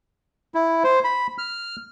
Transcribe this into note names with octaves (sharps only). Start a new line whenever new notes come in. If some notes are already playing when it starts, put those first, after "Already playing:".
E4
C5
B5
F6